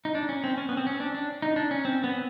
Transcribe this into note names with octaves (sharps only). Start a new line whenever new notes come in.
D#4
D4
C#4
C4
C#4
B3
C4
C#4
D4
D4
D#4
D4
C#4
C4
B3